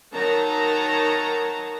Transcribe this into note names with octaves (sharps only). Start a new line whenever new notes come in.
D#3 F#3 D#4 C#5 A5 A#5